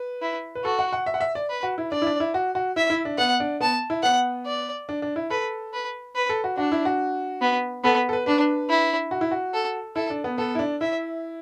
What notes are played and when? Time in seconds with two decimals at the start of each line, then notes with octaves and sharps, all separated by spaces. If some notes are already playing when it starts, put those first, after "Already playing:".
Already playing: B4
0.22 E4
0.55 B4
0.64 F#4 A4
0.79 F#5
0.93 F#5
1.06 E5
1.14 F#5
1.21 E5
1.35 D5
1.50 B4
1.63 F#4
1.78 E4
1.92 D4 D5
2.02 E4
2.06 D4
2.20 E4
2.34 F#4
2.55 F#4
2.76 E4 E5
2.90 E4
3.05 D4
3.18 B3 F#5
3.40 D4
3.60 B3 A5
3.90 E4
4.03 B3 F#5
4.46 D5
4.89 D4
5.02 D4
5.16 E4
5.30 A4 B4
5.73 B4
6.15 B4
6.29 A4
6.44 F#4
6.57 D4 F#4
6.72 E4
6.85 F#4
7.42 B3
7.84 B3 A4
8.09 A4
8.13 B4
8.26 D4 B4
8.70 E4
9.11 F#4
9.21 E4
9.31 F#4
9.53 A4
9.96 E4 A4
10.10 D4
10.24 B3
10.38 B3 A4
10.55 E4
10.59 D4
10.81 E4 E5